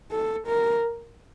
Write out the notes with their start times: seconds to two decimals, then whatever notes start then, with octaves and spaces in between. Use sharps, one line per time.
0.11 A4
0.47 A#4